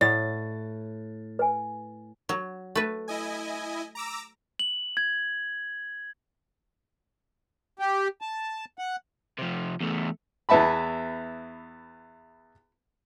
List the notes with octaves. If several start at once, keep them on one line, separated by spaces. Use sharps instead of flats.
A2 D5 F#5 A6
B4 G#5
F#3
A3 B4
E4 D#5 G#5
A#5 D6 E6
F#7
G#6
G4
A5
F#5
C3 F3
E2 A3
E2 E3 B3 E5 A5 B5